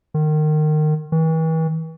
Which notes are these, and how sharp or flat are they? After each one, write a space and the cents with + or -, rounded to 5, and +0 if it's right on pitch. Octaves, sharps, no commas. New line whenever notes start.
D#3 -25
E3 -40